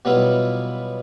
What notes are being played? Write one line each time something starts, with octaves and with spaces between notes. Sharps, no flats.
B2 F#3 G3 B3 E4 F4